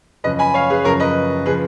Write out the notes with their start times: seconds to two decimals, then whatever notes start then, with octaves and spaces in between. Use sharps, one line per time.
0.24 F#2 C#3 F3 B4 D#5
0.39 G#5 B5
0.54 C#5 F5
0.70 G#4 B4
0.84 F#2 C#3 F3 A#4 C#5
1.00 B4 D#5
1.46 C#3 F3 G#4 B4